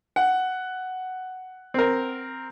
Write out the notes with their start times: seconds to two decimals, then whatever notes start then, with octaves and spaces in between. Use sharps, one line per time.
0.16 F#5
1.74 C4 A#4